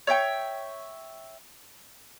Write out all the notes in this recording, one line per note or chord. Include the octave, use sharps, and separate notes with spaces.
C#5 E5 G5 C#6